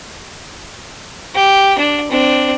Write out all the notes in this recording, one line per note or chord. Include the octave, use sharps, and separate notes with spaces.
G4
D4
C4 D4